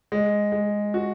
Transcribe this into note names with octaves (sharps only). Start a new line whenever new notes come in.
G#3
G#3
F#4